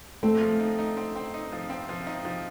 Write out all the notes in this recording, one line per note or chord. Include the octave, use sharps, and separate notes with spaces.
A3 C4
F3
D#4
D#4
C4
C4
D#4
F3
C4
F3
D#4
F3